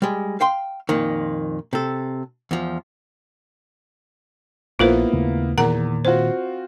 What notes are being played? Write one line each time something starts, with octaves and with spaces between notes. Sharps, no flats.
G3 G#3
F5 G5 C6
F2 A#2 D#3
C3 A4
E2 F3
A#1 A#3 B3 E4 F4 A#4 C5
D#2 C#3 A3
E2 A#2 D#3 A#3 A#4 F#5 A#5
C4 F4 F#4 C5